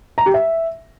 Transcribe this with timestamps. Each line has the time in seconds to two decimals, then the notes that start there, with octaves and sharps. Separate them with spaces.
0.18 A#5
0.26 G4
0.34 E5